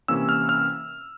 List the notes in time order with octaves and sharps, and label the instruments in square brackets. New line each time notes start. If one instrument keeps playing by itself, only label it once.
[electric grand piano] C3 E3 A#3 C#4 E6
F6
F6